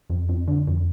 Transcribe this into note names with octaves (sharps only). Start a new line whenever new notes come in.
F2
F2
D3
F2